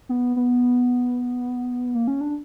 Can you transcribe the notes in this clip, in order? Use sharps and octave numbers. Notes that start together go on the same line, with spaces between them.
B3
B3
A#3
C#4
D4